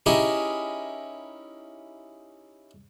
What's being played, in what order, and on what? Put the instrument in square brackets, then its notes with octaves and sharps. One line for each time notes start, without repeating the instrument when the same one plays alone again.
[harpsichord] C#4 D#4 E4 G4 G#4 A#4